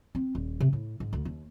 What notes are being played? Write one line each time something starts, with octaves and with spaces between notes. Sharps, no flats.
C4
D#1
C3
A2
G#2
D2
D#2